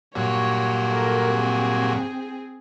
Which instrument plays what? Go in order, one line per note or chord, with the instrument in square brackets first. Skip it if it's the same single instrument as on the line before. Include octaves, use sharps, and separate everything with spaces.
[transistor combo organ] G2 A#2 F#3 [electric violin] C#5
[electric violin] A4 A#4
C4 G#4